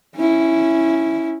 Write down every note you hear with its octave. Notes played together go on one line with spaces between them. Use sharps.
C#4 E4